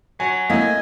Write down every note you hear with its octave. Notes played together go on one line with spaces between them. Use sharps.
F#3 G#5
A2 A#3 C4 E4 D#5 G#5 B6